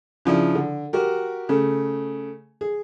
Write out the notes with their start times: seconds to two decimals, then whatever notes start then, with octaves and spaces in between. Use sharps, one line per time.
0.25 C#3 F3 D4 E4
0.55 D3
0.93 F#4 G4 A#4
1.49 C#3 A3
2.61 G#4